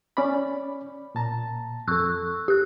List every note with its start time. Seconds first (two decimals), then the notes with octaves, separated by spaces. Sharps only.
0.17 C#4 D5 B5
1.15 A#2 A5 A#5
1.88 F2 A4 C#6 E6 F#6
2.48 G4 F#6